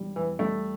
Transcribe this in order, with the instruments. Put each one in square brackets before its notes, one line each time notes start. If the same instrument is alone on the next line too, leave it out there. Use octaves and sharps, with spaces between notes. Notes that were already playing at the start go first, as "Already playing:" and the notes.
Already playing: [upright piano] E1 G3
[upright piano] E2 [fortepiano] E3
[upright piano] G3 [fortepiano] A3